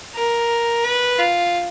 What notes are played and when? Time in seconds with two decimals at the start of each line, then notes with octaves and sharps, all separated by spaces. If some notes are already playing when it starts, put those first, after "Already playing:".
0.15 A#4
0.84 B4
1.18 F4